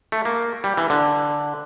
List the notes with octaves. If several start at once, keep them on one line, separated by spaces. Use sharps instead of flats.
A3
A#3
G3
E3
D3